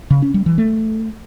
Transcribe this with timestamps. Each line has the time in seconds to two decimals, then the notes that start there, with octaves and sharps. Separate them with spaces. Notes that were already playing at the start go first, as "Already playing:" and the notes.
0.10 C#3
0.22 C#4
0.34 G3
0.46 E3
0.58 A3